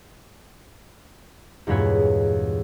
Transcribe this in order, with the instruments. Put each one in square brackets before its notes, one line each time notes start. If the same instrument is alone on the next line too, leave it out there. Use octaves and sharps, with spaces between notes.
[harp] E2 G2 A#2 G#3 B4 C#5